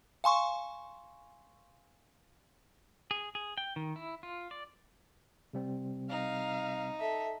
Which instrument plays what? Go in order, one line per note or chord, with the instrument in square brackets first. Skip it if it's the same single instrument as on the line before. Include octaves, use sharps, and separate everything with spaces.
[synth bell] F5 G#5 C6 C#6
[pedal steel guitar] G#4
G#4
G5
D#3
E4
F4
D5
[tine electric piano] C3 G3 C4
[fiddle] D#4 [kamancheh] F5
[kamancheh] A4 E5